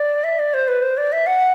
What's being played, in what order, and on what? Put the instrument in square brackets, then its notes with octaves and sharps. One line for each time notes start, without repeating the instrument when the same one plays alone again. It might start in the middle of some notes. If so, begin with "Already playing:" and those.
Already playing: [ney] D5
E5
D5
C5
B4
C5
D5
E5
F#5